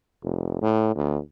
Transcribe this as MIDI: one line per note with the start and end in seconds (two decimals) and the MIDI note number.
0.23 0.57 29
0.62 0.93 45
0.96 1.18 38